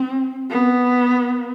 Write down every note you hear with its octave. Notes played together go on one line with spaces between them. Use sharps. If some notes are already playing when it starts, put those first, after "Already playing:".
Already playing: C4
B3